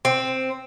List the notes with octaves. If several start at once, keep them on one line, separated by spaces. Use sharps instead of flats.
C4